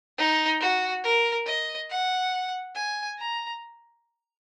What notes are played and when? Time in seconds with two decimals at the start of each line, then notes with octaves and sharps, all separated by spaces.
0.18 D#4
0.60 F#4
1.04 A#4
1.46 D#5
1.90 F#5
2.76 G#5
3.19 A#5